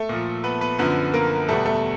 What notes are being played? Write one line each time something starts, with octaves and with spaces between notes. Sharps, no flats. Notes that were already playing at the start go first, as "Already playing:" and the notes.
Already playing: A3 A4
A#2 F3
B3 B4
B3 B4
F#2 D3 F3 B3 B4
A#3 A#4
E2 B2 G3 A3 A4
A3 A4